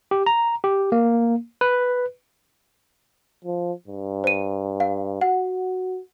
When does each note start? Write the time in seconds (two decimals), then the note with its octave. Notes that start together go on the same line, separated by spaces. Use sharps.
0.11 G4
0.26 A#5
0.64 G4
0.92 A#3
1.61 B4
3.45 F3
3.88 G2
4.24 C5 D#7
4.80 F5
5.21 F#4 F#5